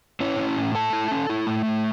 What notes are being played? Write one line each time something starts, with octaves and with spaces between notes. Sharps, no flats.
C#4 E4 C#5
C#4
A2
A3 A4 A5
E4
C#4
E4
A3
A2